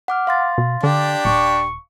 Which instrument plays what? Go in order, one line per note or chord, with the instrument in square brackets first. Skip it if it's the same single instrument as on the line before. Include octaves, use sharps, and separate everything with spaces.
[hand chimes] F#5 D6 F6
F5 C6 A6
[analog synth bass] B2
[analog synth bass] D3 [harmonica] D4 G4
[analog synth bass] D#1 [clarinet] C#6